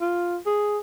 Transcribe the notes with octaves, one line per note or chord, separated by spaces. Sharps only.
F4
G#4